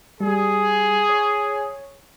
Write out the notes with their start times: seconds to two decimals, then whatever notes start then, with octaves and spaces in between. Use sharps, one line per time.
0.20 G3 G#4
1.09 C#5